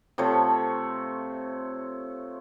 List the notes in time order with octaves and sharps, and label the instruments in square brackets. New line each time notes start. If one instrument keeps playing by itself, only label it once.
[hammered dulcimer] C3 F3 A3 C#5